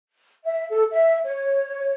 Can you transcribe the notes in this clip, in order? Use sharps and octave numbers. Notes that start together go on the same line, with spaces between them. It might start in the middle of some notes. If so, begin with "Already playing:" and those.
E5
A4
E5
C#5